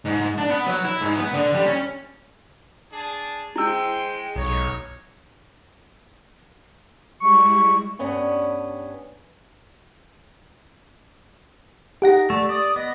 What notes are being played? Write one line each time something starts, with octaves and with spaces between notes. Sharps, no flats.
G#2
D4
B3
F#3
E4
G#2
B3
D3
G3
C#4
D4 G#4 A5
G#3 E4 C5 G5 E6
B1 D#4 C#5
G3 G#3 E4 C#6
G2 B3 C#4 D4 C#5 G#5
D#4 G4 F#5 A#6
A3 D5
D5 D#6
B3 D#5